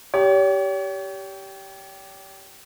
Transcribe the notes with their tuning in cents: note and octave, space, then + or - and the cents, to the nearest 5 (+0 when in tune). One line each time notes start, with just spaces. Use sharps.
G4 -10 C#5 +40